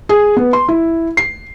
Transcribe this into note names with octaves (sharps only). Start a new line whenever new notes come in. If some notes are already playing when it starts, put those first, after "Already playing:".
G#4
B3
C6
E4
C7